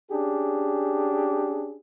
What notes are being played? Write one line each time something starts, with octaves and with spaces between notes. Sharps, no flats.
C#4 D4 G4 G#4